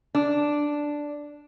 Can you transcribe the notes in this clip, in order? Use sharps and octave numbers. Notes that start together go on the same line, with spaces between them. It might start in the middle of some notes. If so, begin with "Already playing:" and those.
D4